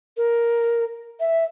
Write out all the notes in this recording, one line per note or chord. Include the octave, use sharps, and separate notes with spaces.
A#4
E5